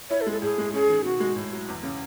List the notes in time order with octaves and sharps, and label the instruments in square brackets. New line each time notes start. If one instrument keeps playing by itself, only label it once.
[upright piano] E4 [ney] C#5
[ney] A4
[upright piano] G#3
[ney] A4
[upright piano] A2 [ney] G#4
[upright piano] G#3
[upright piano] C#4 [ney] G#4
[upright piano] D#3
[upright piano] B2 [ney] F#4
[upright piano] G#3
A2
F#3
E2
C#3